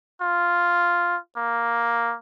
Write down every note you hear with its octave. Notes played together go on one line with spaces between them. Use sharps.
F4
A#3